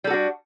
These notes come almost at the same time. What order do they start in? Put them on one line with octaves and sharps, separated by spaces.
G3 A4 F#4 D4